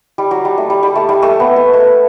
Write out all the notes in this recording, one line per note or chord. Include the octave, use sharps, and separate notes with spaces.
G3
F#3
G3
A3
G3
G3
A3
G3
A3
B3
B3
A3